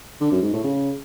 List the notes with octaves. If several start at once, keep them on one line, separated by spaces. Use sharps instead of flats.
D3
F#2
G#2
A2
C#3